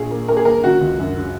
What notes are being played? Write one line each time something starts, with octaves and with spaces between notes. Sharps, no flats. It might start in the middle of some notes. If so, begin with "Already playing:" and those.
Already playing: A#1 G#4
A#3
A#3 A#4
G#4
A#3 A#4
C#3 F#4
C#2
F#2
C#3